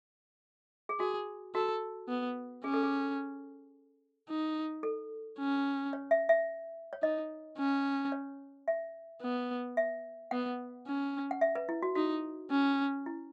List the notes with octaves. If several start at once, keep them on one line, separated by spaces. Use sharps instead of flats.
G#4
F#4 G#4
F#4 A4
B3
C#4 G#4
A4
G#4
D#4
A4
C#4
C#5
E5
E5
C#5
D#4 D#5
C#4
C#5
E5
B3
E5
B3 F#5
C#4
F#5
E5
B4
E4
F#4
D#4 F#4
C#4
E4